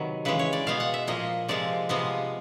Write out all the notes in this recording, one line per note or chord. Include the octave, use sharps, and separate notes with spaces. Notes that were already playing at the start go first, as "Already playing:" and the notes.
Already playing: C3 D#3 F#3 B4
C#3 E3 G#3 B4
C#5
D5
B2 G#3 B3 F5
F#5
E5
A#2 F3 A#3 D#5
C3 F3 G#3 C4 D5
C3 F3 G#3 B3 D#5